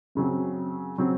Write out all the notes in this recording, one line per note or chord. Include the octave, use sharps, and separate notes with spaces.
F#2 C#3 F#3 C4
C#3 F#3 C4